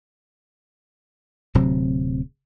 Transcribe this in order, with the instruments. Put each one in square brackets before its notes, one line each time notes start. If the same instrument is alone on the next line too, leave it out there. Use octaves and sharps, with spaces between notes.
[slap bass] D1 C3 F#3 C4